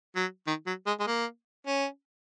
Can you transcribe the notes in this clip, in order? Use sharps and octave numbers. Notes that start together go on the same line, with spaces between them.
F#3
D#3
F#3
G#3
G#3
A#3
C#4